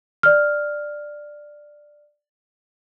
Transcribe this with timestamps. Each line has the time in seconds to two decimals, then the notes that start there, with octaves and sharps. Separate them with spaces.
0.23 D5 F6